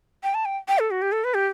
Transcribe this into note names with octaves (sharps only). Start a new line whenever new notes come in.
G5
A5
G5
G5
A4
F#4
G4
A4
B4
G4